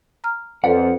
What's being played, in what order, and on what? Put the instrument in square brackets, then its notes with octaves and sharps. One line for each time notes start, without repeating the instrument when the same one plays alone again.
[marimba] A#5 F6
[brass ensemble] F2 [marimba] A4 B4 D5 [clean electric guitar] F#5